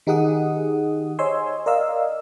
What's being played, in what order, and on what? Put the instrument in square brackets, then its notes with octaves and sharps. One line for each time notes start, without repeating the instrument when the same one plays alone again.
[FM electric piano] D#3 D#4 G4 G#4 F#5 D#6
C5 C#5 D#5 G#5 C6 E6
A#4 D5 D#5 F5 E6